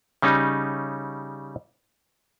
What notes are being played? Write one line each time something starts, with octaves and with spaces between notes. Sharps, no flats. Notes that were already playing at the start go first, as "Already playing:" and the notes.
C#3 G3 C#4 D#4